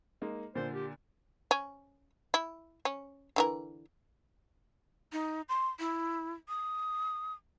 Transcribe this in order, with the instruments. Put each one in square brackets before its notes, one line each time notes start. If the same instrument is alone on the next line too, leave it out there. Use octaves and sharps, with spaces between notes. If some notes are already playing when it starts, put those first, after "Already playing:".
[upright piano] G#3 A#3 D#4
[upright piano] A#2 D3 [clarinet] C5
[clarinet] G4
[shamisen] C#4
E4
C#4
D3 E3 A#4
[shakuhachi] D#4
C6
E4
D#6